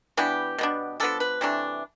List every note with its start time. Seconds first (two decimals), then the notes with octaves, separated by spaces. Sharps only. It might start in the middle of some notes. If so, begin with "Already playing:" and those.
0.17 E3 B3 D4 G4
0.58 B2 B3 D4
1.00 F3 B3 D4 A4
1.20 B4
1.41 C3 E3 A3 D4